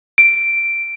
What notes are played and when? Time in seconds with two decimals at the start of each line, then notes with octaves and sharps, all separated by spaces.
0.18 D7